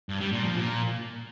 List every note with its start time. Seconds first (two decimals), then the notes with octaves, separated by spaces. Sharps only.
0.09 G2
0.21 G3
0.32 A#2
0.44 F3
0.56 A#2